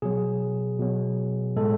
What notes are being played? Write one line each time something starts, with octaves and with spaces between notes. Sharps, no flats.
B2 F#3 G#4
B2 F#3
A2 G#3 A4